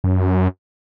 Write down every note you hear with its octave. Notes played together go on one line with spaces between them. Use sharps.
F#2